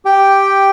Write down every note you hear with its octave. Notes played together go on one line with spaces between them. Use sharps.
G4 G5